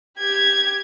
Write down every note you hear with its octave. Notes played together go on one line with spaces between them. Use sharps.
G4 G#6